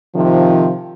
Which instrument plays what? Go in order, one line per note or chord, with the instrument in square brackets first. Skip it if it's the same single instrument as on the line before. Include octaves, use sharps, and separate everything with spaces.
[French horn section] C3 D#3 F3